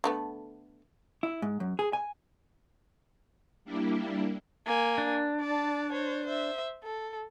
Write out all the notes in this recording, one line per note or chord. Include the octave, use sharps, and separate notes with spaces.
D3 A3 B3
E4
G#2
F#2
G#4
G#5
G3 A#3 D4 E4 G4
A#3 G#5
D4
D5 A5
C5 C#5
C5 E5
A4